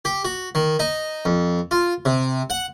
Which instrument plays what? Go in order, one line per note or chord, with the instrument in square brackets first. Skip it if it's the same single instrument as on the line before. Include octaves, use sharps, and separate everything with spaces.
[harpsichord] G4
F#4
D#3
D#4
F2
F4
C3
F#5